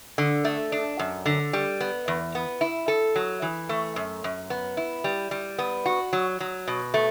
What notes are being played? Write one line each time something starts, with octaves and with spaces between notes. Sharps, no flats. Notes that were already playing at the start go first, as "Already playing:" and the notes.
D3
A3
D4
F#2
D3
G3
B3
E2
B3
E4
A4
F#3
E3
A3
F#2
F#2
B3
E4
G3
G3
B3
F#4
F#3
F#3
B2
A3